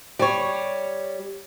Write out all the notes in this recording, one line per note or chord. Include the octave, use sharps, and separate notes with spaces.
G3 C#5